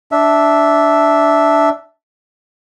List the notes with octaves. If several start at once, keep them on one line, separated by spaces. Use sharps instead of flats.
D4 E5